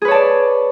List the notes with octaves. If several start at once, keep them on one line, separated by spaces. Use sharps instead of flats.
G#4 B4 C#5 D5 A5